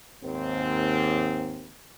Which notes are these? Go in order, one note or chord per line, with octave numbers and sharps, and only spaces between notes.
D#2 G#2 C4